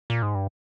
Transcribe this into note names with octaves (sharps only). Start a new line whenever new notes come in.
A#2
G#2
G2